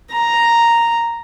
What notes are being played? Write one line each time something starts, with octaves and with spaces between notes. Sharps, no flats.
A#5